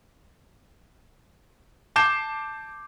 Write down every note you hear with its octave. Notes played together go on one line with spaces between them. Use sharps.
A5 D6 G6 C7 E7